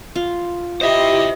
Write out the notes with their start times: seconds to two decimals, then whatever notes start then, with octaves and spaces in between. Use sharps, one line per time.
0.16 F4
0.81 E4 G4 C5 D#5 E5